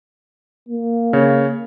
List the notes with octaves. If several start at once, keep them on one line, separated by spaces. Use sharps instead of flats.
A#3
C#3 C#5